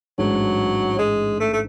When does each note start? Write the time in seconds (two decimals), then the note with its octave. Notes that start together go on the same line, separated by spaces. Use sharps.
0.18 A1 G#2 F#3 G#3 D4 G#4
0.99 G#3
1.40 A3
1.53 A3